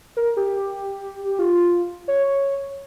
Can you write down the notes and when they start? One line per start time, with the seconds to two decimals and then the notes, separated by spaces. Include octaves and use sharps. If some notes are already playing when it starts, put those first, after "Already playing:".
0.17 A#4
0.37 G4
1.39 F4
2.08 C#5